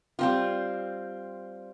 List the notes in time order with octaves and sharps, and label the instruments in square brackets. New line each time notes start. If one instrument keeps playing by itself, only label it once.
[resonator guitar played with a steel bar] G3 C4 F4